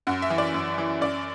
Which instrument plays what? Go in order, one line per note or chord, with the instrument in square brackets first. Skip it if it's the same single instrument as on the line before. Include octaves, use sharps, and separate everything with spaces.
[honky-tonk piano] F#2 F#5
E5
E3
D5
F#2
E3
F#2 D5